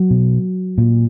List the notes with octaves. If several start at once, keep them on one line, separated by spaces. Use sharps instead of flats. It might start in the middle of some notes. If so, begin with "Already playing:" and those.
Already playing: F#3
B2
A#2